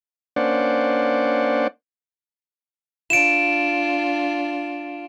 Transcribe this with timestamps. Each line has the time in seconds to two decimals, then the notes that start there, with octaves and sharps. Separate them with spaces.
0.36 A#3 C#4 D4 C5 D5 F#5
3.10 D4 F4 D7 E7